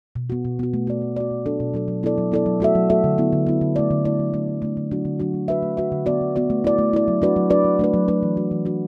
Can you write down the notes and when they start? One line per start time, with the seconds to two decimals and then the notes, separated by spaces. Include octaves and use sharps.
0.16 B2
0.30 B3 F#4
0.45 B2
0.59 B3 F#4
0.74 A3
0.87 F#4 D5
1.02 A3
1.16 F#4 D5
1.31 B2
1.45 F#3 D4 A4
1.60 B2
1.74 F#3 D4 A4
1.88 F#3
2.03 B3 E4 A4 D5
2.18 F#3
2.32 B3 E4 A4 D5
2.46 F#3
2.60 A3 F#4 A4 E5
2.75 F#3
2.90 A3 F#4 A4 E5
3.04 D3
3.18 B3 E4
3.33 D3
3.47 B3 E4
3.61 D3
3.76 A3 E4 D5
3.91 D3
4.05 A3 E4 D5
4.19 F#3
4.34 A3 D4
4.48 F#3
4.62 A3 D4
4.77 D3
4.91 F#3 D4 F#4
5.05 D3
5.20 F#3 D4 F#4
5.34 A3
5.48 F#4 B4 E5
5.63 A3
5.77 F#4 B4 E5
5.92 D3
6.06 B3 F#4 D5
6.21 D3
6.36 B3 F#4 D5
6.50 A3
6.64 E4 D5
6.78 A3
6.93 E4 D5
7.08 F#3
7.22 D4 F#4 B4 D5
7.36 F#3
7.50 D4 F#4 B4 D5
7.64 F#3
7.79 A3 D4 B4
7.94 F#3
8.08 A3 D4 B4
8.23 E3
8.37 D4 F#4
8.51 E3
8.65 D4 F#4